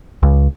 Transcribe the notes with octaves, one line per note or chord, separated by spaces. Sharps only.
C#2